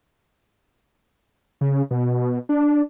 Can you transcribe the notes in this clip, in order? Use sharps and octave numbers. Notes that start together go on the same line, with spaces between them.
C#3
B2
D4